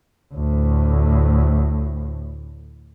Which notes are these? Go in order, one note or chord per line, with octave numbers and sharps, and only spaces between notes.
D2 A2